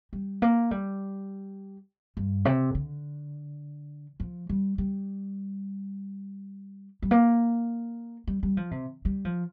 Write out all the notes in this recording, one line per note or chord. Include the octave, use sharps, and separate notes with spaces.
G3
A#3
G3
G2
C3
D3
F3
G3
G3
G3
A#3
G3
G3
F3
C3
G3
F3